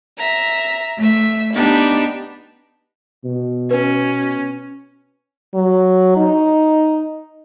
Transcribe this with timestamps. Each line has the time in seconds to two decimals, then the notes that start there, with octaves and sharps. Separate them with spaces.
0.17 E5 A#5
0.98 A3 E5
1.52 B3 D4 D#4 G4
3.24 B2
3.71 C#4 B4
5.54 F#3
6.17 D#4